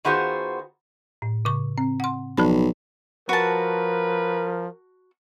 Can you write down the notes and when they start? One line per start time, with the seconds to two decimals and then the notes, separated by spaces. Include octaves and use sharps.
0.05 D#3 B3 F4 F#4 G#4 C5
1.22 A2
1.45 C#3 C#6
1.78 C4
2.00 F#5 C6
2.37 B1 F3 A5 B5
3.29 F3 F#4 A#4 B4 A5